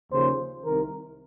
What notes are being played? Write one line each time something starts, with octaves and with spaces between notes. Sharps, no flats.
D#2 C#3 F3 C5
C2 C3 D#3 A#4